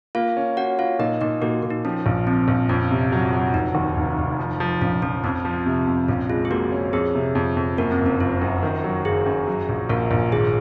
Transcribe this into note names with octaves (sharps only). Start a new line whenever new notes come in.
A#3 F4 F5
C#4
C#4 F#4 F#5
C#4 F4 F5
A#2 D#4 D#5
A#2 D#4 D#5
A#2 F#4
A#2
D#4
F3 C#4
A#1
F3 C4
A#1
F2 C#4
C3
F#3
F#3
F1 D#4
D#2
F1
F1
F3
F3
A#1 C#4
F3 C#4
F2 C4
F3
C3
F2
A#1 C#4
G#3 F4
G#4
A#2 F#4
C#4
F2 G#4
C3
F2
F2
F#2 A#3 A#4
C4
F#1
C#4
F#1 F4
F#2
D#3
F#3
F#1 G#4
F#2
F#3
A#1
A#1 A#3 A#4
A#1
G#1 G#4